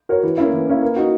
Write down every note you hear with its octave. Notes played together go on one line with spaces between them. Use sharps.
F#4 A#4 C#5
E3
A#3 C#4 E4
E3
A#3 C#4 E4
A#3
D#4 F#4